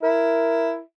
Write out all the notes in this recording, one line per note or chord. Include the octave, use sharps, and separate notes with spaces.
E4 A#4